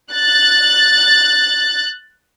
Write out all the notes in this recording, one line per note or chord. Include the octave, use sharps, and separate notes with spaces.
F#6 A6